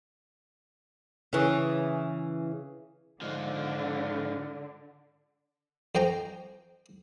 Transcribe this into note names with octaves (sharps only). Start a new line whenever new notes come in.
C#3 E3
G#2 D3 F3
F2 C5 G5 G#5 A#5